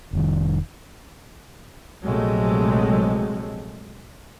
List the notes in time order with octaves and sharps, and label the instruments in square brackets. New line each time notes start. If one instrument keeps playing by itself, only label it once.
[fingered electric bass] F1 D#3
[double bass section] A#1 C3 F#3 G#3 A3